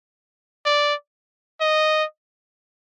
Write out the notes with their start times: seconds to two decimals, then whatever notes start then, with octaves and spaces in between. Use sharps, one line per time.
0.65 D5
1.61 D#5